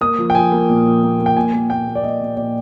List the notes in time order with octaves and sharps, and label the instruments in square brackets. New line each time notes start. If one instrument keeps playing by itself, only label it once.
[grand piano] A#3 D#6
F3
G5
F3 G#5
A#3
A#2
F3
A#3
A#3
G5
A#2 G#5
A#3
A#2 G5
A#3
D5
A#3 D#5
A#2
A#2 D5